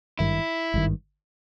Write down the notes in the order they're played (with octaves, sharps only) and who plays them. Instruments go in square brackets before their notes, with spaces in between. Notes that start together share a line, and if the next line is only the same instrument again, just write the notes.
[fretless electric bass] G#1 G2 D#3 [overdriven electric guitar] E4
[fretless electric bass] G#1 G2 D#3